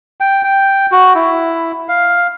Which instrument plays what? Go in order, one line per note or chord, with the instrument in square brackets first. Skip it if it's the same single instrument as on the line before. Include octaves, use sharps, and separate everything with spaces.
[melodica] G5
G5
F#4
E4
F5